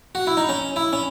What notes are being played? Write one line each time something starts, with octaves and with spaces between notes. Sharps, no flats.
F#4
E4
D#4
C#4
E4
C#4